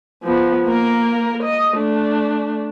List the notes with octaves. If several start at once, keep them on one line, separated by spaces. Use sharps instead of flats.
F3 B3
A#3 A#4
D#5
A3 D4